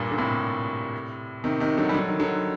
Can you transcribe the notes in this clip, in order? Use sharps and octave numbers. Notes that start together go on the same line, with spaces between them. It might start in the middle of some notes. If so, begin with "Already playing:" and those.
Already playing: G2 A#2
D3
A2 C3
C3 D#3
C3 D#3
D3 F#3
G3
D3 F#3
D#3
D3 F#3